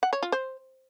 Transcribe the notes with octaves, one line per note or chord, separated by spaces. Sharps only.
F#5
C#5
F4
C5